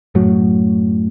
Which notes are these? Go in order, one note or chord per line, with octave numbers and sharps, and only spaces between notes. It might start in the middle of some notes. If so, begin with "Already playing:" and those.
F#2 A2 F#3